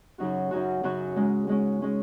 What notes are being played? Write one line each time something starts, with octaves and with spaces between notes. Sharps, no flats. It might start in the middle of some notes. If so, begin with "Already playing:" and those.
F#2 C#3 F#3 D#4 F#4
F#2 C#3 F#3 D#4 F#4
F#2 C#3 F#3 D#4 F#4
G#2 G#3 C#4
G#2 G#3 C#4
G#3 C#4